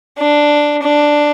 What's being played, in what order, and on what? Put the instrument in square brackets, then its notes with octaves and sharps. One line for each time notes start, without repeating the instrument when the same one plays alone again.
[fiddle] D4
D4